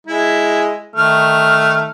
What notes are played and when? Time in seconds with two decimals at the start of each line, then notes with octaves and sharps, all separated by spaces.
0.07 G#3 E4
0.96 D#3 A3 F6